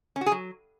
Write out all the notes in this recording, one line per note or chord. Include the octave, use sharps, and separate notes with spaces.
C#4
F#4
G#4
F#3